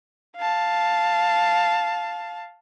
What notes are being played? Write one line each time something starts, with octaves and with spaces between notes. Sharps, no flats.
F5 A5